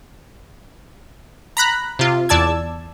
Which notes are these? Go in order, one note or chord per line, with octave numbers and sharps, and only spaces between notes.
A#5 B5 F#6
C3 F4
E2 D5 A5 E6 G#6